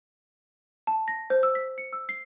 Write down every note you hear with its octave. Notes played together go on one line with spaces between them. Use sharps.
A5
A#6
C5
E6
B6
C#7
E6
C7